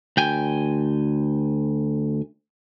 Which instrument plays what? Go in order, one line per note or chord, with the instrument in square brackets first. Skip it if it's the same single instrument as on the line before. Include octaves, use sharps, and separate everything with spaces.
[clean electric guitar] D2 G5 G#5